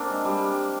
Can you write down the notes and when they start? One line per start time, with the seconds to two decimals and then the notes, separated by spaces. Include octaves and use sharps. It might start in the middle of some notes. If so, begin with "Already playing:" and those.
Already playing: A#3 C4 D4
0.10 G#3
0.25 G3